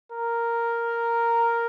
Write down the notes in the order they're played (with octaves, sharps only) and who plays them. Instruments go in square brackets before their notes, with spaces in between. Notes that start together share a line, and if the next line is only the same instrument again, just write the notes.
[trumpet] A#4